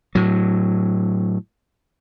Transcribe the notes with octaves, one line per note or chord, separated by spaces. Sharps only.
A2 F#3